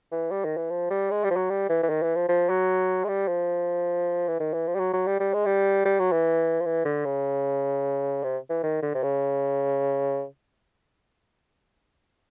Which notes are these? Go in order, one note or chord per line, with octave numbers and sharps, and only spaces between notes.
E3
G3
D#3
E3
F3
G3
G#3
G3
F3
F#3
G3
E3
E3
D#3
E3
F3
F3
F#3
G#3
G3
F3
E3
D#3
E3
F3
G3
F#3
F#3
G3
G3
G#3
G3
G3
F#3
E3
F3
E3
D3
C#3
C3
E3
D#3
D3
C3
C#3